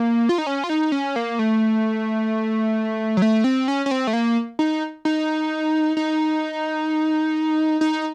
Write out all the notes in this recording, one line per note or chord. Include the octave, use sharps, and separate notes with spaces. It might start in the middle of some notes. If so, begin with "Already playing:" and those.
Already playing: A#3
F4
D#4
C#4
F4
D#4
C#4
A#3
A3
F#3
A3
C4
C#4
C#4
C4
A3
A#3
D#4
D#4
D#4
D#4